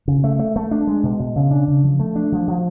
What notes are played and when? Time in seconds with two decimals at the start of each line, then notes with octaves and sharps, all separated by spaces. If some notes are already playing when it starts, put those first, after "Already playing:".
0.08 C#3
0.24 A3
0.39 A3
0.56 A3
0.71 D4
0.87 G#3
1.03 B2
1.20 B2
1.36 C#3
1.51 D4
1.68 C#3
1.84 F3
2.00 A3
2.16 D4
2.32 F3
2.48 F3